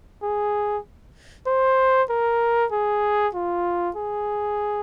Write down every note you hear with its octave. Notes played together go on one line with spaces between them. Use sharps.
G#4
C5
A#4
G#4
F4
G#4